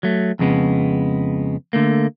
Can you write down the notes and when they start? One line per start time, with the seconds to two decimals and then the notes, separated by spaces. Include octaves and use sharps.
0.03 F#3 A3
0.39 F2 C#3 G#3 B3
1.73 D3 A3 A#3